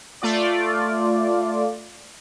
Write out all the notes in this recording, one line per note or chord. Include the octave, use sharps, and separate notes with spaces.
A3 F4 D5